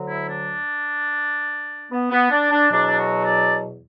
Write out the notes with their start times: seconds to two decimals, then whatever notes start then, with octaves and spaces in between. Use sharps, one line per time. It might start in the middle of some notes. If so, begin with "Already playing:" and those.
Already playing: D2 D3 F#3
0.09 E4
0.29 D4
1.91 B3
2.11 B3
2.31 D4
2.51 D4
2.71 E2 B2 F#3 D4
2.98 F#4
3.25 D5